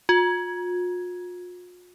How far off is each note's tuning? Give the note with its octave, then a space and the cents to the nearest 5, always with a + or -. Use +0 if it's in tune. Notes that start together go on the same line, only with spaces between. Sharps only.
F4 +45